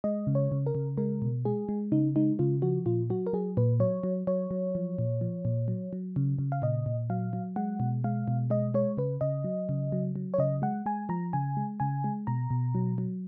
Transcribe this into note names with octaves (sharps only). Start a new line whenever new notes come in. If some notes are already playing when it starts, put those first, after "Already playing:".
G#3 D#5
C#3
C#5
C#3
A#4
C#3
G#3 A#4
B2
G#3 G#4
G#3
C#3 D#4
G#3 D#4
C#3 F4
F3 F#4
A#2 F4
F#3 F#4
A#4
F#3 G#4
A#2 B4
F#3 C#5
F#3
F#3 C#5
F#3
F3
A#2
F3
A#2
F#3
F#3
C#3
C#3
F5
A#2 D#5
A#2
F#3 F5
F#3
G#3 F#5
B2
G#3 F5
B2
G#3 D#5
G#3 C#5
C#3 B4
C#3 D#5
F#3
C#3
F#3
F#3
C#5
C#3 D#5
G#3 F#5
G#3 G#5
F3 A#5
C#3 G#5
G#3
C#3 G#5
G#3
B2 A#5
B2
F#3
F#3